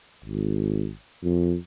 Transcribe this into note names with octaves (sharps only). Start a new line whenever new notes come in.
G#1
F2